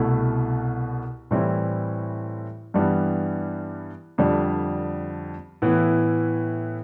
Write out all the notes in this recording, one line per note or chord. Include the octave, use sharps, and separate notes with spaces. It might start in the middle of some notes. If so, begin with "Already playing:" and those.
Already playing: C2 B2 A3 E4
A2 E3 G3 C4 E4
G2 E3 G3 B3
F2 D3 G3 D4
A2 E3 B3 E4